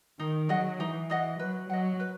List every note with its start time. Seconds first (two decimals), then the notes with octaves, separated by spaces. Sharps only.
0.19 D#3 D#4
0.49 F#3 G#4 D#5 F#5
0.79 E3 D#4
1.10 G#4 D#5 F#5
1.39 F#3 B4
1.69 F#3 D#5 F#5
2.00 B4